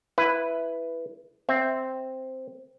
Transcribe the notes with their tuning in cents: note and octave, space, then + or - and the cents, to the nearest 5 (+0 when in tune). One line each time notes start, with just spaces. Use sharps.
E4 +5 B4 +0
C4 +0 E5 -10